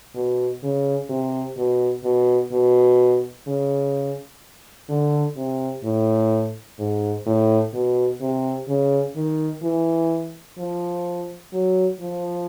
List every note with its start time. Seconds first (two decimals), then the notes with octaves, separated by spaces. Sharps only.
0.15 B2
0.63 C#3
1.09 C3
1.57 B2
2.04 B2
2.52 B2
3.47 C#3
4.89 D3
5.37 C3
5.84 A2
6.79 G#2
7.26 A2
7.74 B2
8.21 C3
8.68 C#3
9.16 D#3
9.63 E3
10.58 F3
11.53 F#3
12.00 F3